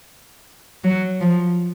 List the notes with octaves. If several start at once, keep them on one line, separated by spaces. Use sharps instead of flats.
F#3
F3